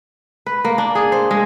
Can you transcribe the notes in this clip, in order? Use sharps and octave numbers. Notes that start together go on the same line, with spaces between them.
B4
A#3
D4
G#4
C5
G#3